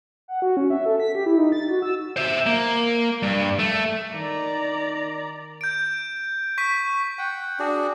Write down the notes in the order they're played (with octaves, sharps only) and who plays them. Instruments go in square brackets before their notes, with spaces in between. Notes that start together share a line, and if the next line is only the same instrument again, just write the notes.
[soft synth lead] F#5
F#4
C#4
E5
A4
B6
G4
E4
D#4
A6
F#4
E6
[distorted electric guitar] C5 E5
A#3
G2
A3
[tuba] D#3 [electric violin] D5 A#5
[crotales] G6 D7
C#6 B6 D#7
[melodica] F#5 G5
D4 F#4 G#4 D5